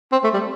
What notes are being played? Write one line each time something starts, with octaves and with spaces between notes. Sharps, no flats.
C4
A3
G3